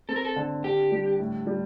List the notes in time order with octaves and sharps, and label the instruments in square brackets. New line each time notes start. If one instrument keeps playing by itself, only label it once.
[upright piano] C4 [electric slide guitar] A4
[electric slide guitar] A#4
A4
[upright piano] D3
[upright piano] D3 [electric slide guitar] G4
[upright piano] G3
A2
G3